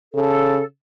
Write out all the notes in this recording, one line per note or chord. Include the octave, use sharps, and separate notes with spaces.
C#3 A4